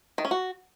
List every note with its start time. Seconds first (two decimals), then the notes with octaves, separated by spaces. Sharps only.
0.18 D#3
0.25 C#4
0.31 F#4